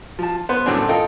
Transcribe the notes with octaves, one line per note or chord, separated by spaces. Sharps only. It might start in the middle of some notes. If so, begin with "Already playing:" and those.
F3 A5
B3 B4 C5
F#2 A2 D3 F#3 C4 D4
F4 A4 A#4 D#5 G5